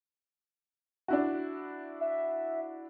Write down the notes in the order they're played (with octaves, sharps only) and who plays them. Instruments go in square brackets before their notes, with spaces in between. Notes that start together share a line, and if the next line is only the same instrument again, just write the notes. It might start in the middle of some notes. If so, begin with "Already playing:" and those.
[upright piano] D4 E4 F#4
[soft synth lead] E5